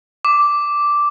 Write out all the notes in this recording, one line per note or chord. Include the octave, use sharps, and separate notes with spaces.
D6